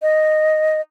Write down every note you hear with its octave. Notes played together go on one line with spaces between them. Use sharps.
D#5